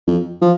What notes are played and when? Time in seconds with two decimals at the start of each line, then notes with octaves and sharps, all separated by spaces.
0.07 F2
0.42 F3